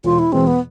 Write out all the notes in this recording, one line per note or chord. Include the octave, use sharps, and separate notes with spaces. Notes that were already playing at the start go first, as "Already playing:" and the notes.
E1 F4
E4
E2 B2 G#3 C4
B3